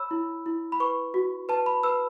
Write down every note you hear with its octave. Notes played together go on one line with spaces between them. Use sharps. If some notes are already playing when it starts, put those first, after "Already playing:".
Already playing: C#5 B5 E6
E4
E4
B5
B4 C#6
F#4
B4 A5
B5
B4 E6